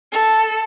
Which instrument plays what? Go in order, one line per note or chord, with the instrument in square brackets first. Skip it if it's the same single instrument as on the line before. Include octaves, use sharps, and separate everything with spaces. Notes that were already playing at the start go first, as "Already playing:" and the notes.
[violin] A4